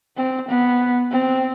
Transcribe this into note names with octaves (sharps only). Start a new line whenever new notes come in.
C4
B3
C4